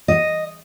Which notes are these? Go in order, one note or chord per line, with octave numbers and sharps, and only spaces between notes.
D#5